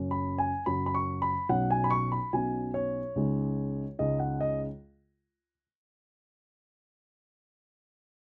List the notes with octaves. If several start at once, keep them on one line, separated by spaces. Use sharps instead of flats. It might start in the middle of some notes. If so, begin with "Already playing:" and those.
Already playing: F#1 F#2 F#3 C#4
B5
G#5
F#1 F#2 F#3 C#4 B5
B5
C#6
B5
B1 B2 F#3 C#4 F#5
G#5
B5
C#6
B5
B1 B2 F#3 C#4 G#5
C#5
C#2 C#3 G#3 D#4
C#2 C#3 G#3 D#4 D#5
F#5
D#5